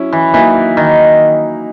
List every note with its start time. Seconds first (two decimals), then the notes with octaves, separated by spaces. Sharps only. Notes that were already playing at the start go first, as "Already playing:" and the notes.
Already playing: F#3 C#4 E4
0.12 E3
0.34 E3 F#3 A#3 D#4
0.77 D#3